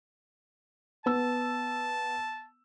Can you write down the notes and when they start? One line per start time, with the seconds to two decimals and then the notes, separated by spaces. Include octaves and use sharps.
1.06 B3 A5 E6